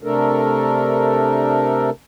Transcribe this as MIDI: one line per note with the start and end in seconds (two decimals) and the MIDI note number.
0.03 1.90 48
0.03 1.90 57
0.03 1.90 62
0.03 1.90 69
0.03 1.90 70